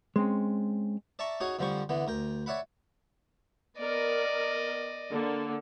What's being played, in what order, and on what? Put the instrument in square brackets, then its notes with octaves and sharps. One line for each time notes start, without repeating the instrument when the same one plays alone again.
[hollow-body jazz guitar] G#3 C4 C#4
[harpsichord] D5 E5 A5 A#5 C#6 D6
C#4 D#4 F#4 G#4 C#5
F2 D3 F3 G3 C5 C#6
D3 E3 B3
D2 A#4 G5
C#5 D5 E5 F#5 B5
[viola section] B3 A#4 [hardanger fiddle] D5 D#5
[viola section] D3 A#3